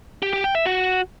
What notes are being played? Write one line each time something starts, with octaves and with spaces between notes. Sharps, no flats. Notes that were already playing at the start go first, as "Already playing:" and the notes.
G4
G4
G5
E5
F#4